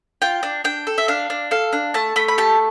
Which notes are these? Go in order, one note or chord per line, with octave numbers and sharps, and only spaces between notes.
F4 G5
D4
D4 G5
A4
E5
D4 F5
D4
A4 F5
D4
A3 A5
A3 B5
B5
G4 A5